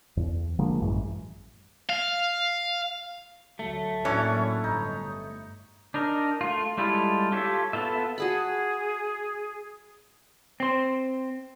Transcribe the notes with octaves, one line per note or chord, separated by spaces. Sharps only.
E2
D3 F3 G#3 A#3
A1 F#2 E3 G#3
F5
D2 F#3 A3
A2 F#3 A#3 C#4 D4 E4 C#5
G1 D#4
D4 D#4 A#4
A3 F4
G3 G#3 E4 F4 A4
F4 G4 A4 C#5 E5
B3 F4 A4 E5
F#4 G#4 A5 B5
C4 C5